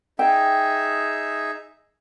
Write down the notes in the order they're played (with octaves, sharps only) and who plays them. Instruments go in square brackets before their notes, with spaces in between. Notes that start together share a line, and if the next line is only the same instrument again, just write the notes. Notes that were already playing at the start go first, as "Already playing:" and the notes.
[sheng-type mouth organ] D#4 G#4 E5 [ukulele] G5